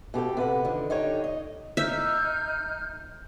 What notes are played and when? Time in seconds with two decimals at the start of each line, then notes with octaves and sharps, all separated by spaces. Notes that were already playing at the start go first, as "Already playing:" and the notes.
0.14 B2 G4 A4 G5
0.37 C3 B4 F#5
0.65 D3 D#3 F3
0.90 D3 D#4 G4 C#5
1.24 D#5
1.77 D#4 E5 F6 G6